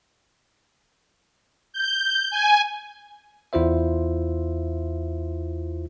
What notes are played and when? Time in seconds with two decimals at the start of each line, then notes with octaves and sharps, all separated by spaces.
1.73 G6
2.30 G#5
3.53 E2 E4 F4 C5 E5